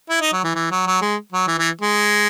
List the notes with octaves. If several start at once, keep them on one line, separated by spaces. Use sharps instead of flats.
E4
D#4
F#3
E3
E3
F#3
F#3
G#3
F#3
E3
E3
G#3